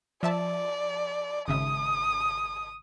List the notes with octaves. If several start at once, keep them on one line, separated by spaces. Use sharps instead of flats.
F3 D5 E5 A5
G#1 C#3 E5 D#6